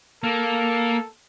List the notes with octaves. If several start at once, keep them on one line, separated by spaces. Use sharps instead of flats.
A#3 A4